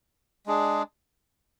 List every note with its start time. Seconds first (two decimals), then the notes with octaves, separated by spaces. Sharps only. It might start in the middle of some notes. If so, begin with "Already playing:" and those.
0.46 G#3 D4 G#4